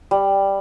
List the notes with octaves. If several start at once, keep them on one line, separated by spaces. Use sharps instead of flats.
G3